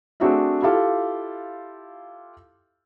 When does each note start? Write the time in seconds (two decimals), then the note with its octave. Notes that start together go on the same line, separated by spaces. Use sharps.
0.20 A3 C4 D4 F#4 G#4 E5
0.62 E4 F4 G4 A4 F5